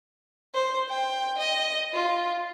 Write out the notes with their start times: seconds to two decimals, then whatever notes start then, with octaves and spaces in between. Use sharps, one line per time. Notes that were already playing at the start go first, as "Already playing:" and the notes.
0.55 C5
0.89 G5
1.39 D#5
1.93 F4